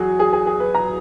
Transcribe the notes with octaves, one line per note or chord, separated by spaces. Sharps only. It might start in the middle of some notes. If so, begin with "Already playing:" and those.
Already playing: E2 F#3 F#4 G#4
G#4
G#4
G#4
B4
A#5